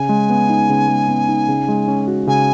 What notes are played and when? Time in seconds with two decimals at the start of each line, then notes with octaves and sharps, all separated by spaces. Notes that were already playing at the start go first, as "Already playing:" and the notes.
Already playing: C#3 G#5
0.09 G#3
0.30 B3
0.49 D#4
0.69 C#3
0.89 G#3
1.09 B3
1.29 D#4
1.49 C#3
1.68 G#3
1.88 C#4
2.08 F#4
2.27 C#3 G#5